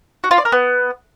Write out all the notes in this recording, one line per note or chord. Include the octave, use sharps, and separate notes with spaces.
F#4
F4
D5
A#4
B3